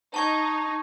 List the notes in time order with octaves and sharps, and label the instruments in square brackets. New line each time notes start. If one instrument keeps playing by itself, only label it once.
[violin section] D#4 [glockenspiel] A5 C#6 G#6